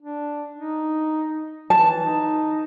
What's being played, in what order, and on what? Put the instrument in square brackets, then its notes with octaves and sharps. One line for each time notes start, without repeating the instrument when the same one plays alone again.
[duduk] D4
D#4
[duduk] E3 [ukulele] A5
[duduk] D#4